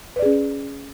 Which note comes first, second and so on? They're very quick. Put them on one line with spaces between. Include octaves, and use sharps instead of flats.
B4 D5 G#4 C#4